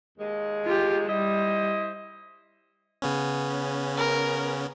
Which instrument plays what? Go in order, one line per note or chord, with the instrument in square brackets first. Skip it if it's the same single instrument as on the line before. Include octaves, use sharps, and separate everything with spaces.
[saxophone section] D#2 G#3
[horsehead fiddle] F4 G4
[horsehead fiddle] G3 [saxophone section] E4 C5 D#5
[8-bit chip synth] C#3 B3 C#4
[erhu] A#4